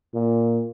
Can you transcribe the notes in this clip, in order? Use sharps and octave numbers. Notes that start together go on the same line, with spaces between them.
A#2